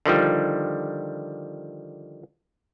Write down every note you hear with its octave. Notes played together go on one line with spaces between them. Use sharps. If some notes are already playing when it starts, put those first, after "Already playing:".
D3 D#3 F3 G3